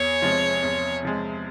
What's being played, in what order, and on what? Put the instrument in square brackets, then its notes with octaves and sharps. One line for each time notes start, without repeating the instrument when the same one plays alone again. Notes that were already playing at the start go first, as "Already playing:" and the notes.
Already playing: [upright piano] E2 [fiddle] C#5
[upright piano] C3 F3 G#3
E2
C3 F3 G#3